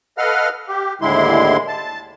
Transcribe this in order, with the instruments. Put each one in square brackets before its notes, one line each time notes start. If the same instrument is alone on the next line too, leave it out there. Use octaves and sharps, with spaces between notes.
[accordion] A4 B4 D#5 F5 F#5 F6
G4
D#2 A2 D3 G#3 E4 C6
A5